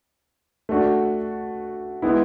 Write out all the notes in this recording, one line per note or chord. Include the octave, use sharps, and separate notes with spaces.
A3 D4 F#4
G#3 B3 E4